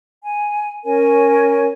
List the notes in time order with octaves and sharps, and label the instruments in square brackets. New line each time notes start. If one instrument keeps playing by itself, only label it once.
[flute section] G#5
C#4 A#4 C#5 G#5